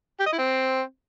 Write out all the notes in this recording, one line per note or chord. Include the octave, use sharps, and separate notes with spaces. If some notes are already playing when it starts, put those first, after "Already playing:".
G4
D#5
E4
C4